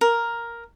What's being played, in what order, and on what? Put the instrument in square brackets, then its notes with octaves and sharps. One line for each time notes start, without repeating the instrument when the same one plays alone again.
[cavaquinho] A#4